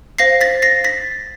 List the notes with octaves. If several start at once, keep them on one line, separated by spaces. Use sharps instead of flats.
C5 F5 A#6 C7
A6 B6
A#6 C7
A6 B6